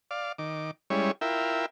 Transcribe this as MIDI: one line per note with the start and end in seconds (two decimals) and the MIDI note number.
0.11 0.32 74
0.11 0.32 77
0.38 0.71 51
0.38 0.71 86
0.90 1.11 55
0.90 1.11 56
0.90 1.11 61
0.90 1.11 64
0.90 1.11 73
1.21 1.66 64
1.21 1.66 65
1.21 1.66 70
1.21 1.66 76
1.21 1.66 79